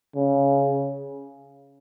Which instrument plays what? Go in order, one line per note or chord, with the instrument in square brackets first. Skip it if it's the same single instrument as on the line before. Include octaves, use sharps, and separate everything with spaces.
[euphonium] C#3